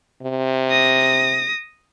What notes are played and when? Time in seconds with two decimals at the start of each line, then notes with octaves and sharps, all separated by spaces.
0.22 C3
0.71 D#6 A#6